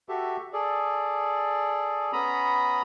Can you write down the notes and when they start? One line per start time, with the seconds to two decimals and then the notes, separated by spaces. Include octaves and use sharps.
0.09 F#4 G4 A4 E5
0.53 G#4 A4 D5
2.13 B3 C#4 A#5 B5 D#6